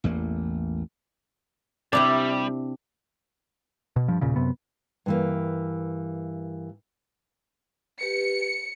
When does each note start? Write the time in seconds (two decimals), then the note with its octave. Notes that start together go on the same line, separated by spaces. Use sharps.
0.04 A1 E2 A3 A#3
1.93 C3 G3 D4 E4 G5
3.96 B2
4.08 G2 F3
4.21 E1 A#2 C#3
4.36 F#2 C3 B3
5.06 G2 E3 A#3
8.01 G4 B4 C#7